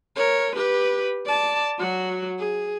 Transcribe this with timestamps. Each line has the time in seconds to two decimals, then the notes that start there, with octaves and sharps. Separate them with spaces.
0.16 A#4 C#5
0.56 G4 B4
1.25 D5 A5
1.78 F#3 F#4
2.39 G#4